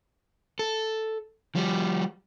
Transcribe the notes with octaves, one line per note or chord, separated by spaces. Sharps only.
A4
F3 G3